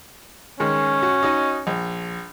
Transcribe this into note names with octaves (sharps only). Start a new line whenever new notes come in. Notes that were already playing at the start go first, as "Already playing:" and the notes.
D#3 G#3 C#4
F#4
D#4 F#4 D#5
A#1